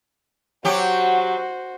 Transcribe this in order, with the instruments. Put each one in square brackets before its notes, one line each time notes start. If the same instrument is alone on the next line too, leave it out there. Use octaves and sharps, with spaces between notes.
[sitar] F#3 G4 [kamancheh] F#4 C5